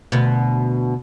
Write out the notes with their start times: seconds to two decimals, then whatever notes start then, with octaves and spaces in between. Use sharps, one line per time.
0.12 D2 B2